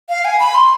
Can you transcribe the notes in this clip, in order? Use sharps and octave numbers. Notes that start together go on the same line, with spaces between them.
F5
G#5
B5
C6